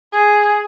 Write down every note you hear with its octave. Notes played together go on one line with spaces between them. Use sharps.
G#4